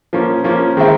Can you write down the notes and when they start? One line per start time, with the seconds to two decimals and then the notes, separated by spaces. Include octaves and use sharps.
0.13 F3 A#3 C#4
0.44 F3 A#3 C#4
0.77 D#3 G#3 C4 E4